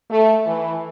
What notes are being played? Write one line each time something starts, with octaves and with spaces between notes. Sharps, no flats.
A3
E3